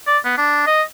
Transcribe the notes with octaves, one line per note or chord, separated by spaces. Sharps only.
D5
B3
D4
D#5